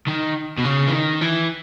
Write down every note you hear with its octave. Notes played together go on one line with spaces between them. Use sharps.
D#3
B2
C#3
E3
D#3
E3